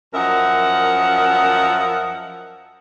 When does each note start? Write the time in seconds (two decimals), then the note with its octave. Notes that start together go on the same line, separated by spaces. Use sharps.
0.13 F#2 F3 A#4 D#5 E5 F#5